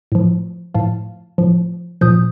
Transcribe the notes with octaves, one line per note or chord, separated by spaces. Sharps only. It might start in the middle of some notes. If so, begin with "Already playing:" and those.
A2 F3
A2 F3 F5 A5
A2 F3
A#2 F3 D#6 G6